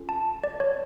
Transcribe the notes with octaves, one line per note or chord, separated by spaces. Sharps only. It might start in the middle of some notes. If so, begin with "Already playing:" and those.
Already playing: C#4 F4 A4
A5
D5
C#5